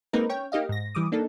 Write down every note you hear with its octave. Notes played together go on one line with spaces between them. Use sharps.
G#3 A#3 C4 D#4 A#4 B4
C#4 C#5 G5
A#3 D#4 G4 D#5 F5
G#2 A#6
E3 G3 D6 D#6
A#3 D4 D#4 A4